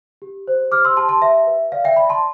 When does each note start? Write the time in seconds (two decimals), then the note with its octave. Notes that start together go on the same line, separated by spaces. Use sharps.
0.22 G4
0.48 C5
0.72 G4 D6 F6
0.85 C6 E6
0.97 G4 A5 C6
1.09 A5 C6
1.21 B4 E5
1.47 B4
1.72 D5 F5
1.84 E5 G5
1.96 D5 G5 B5
2.09 A5 C6